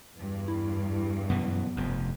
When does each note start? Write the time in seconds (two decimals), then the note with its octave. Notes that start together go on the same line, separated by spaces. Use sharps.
0.16 E2 G2
0.48 E4
1.30 F#2 B2 E3 B3
1.76 F1 F2